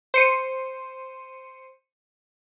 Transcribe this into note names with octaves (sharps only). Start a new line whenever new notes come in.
C5 C#7 D#7